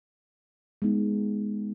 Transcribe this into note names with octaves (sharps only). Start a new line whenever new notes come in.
G#3 B3 D#4